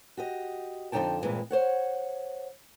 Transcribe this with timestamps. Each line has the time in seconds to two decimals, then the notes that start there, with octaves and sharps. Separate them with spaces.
0.17 F#4 G4 D#5
0.92 F2 D3 F#3 D#4 G5 A5
1.22 G2 A#2 E3 G#3 C4
1.51 C5 C#5 F#5